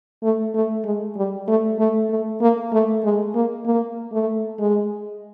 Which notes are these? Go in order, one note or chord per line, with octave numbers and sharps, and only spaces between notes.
A3
A3
G#3
G3
A3
A3
A3
A#3
A3
G#3
A#3
A#3
A3
G#3